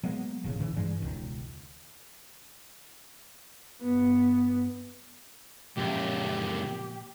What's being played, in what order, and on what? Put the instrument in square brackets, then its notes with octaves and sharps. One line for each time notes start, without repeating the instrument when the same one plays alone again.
[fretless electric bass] F#3 G#3 A#3 B3
E1 A1 C#3
G#2 C#3 E3
G2 E3 G3 G#3
E1 C#2 D#3
[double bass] G2 B3
[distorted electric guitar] C#2 F#2 [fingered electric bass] A#2 F3 A#3 [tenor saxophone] G4